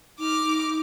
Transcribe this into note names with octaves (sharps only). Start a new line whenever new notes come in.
D#4 D6 F6